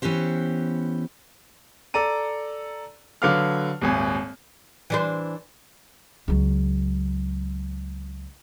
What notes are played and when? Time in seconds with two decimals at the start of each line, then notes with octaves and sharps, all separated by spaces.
0.02 E3 B3 C#4 G4 C5
1.94 A4 D5 A#5 D#7
3.22 D3 F#3 B4 F5 D6 F6
3.82 D#1 G#1 G#5
4.90 E3 D4 C5
6.28 C#2 F#3